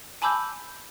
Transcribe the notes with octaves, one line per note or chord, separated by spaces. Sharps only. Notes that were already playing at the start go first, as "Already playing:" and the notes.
G#5 A5 B5 D6 E6 G6